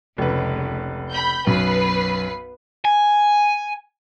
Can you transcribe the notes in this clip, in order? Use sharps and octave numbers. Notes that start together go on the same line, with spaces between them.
F1 C#2 B4
B5 G6
B1 F#2 B3 B4 C7
G#5